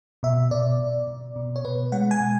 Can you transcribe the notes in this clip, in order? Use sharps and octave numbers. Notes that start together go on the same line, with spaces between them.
B2 E5
B2 D5
B2
B2
B2
C#5
B2 B4
G#3 F#5
G#5
B2